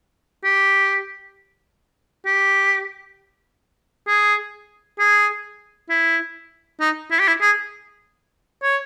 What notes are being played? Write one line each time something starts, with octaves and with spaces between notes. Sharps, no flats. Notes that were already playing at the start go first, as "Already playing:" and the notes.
G4
G4
G#4
G#4
E4
D#4
E4
G4
E4
G#4
C#5